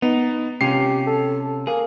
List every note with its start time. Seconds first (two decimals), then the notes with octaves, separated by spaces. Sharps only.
0.02 B3 D#4
0.61 C3 C#4 F4 G4 C7
1.07 A4
1.67 A#3 G#4